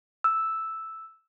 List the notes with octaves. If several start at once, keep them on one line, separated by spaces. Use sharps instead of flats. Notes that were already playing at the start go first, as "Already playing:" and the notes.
E6